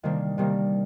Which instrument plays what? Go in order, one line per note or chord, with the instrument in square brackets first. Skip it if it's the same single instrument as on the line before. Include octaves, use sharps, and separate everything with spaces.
[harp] C3 D#3 G3 A#3 D4
C3 D#3 G3 A#3 D4